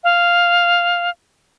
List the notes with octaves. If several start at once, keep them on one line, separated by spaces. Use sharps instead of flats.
F5